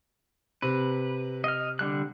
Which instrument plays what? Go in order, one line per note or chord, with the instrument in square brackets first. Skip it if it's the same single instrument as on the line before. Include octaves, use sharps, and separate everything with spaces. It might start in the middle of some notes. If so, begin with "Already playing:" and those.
[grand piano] C3 [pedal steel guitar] B4
[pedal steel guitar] D#5 F6
D3 G3 F#6